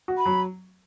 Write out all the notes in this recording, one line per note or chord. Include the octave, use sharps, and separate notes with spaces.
F#4
B5
F#3